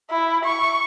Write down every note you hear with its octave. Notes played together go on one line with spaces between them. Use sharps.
E4
C#6